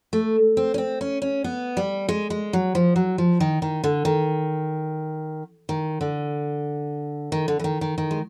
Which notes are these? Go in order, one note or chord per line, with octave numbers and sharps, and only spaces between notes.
A3
C4
C#4
C4
C#4
C#4
B3
G3
G#3
G#3
F#3
F3
F#3
F3
D#3
D#3
D3
D#3
D#3
D3
D#3
D3
E3
D#3
D#3
D#3
G#3